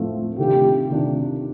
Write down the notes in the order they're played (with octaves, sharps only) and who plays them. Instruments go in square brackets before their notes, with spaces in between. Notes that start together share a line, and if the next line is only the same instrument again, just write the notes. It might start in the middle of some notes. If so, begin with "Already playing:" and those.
Already playing: [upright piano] A2 F3 A3 C4 F4
[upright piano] C3 D#3 A3 D4 F4 [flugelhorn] G4
[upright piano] C3 D#3 A3 D4 F4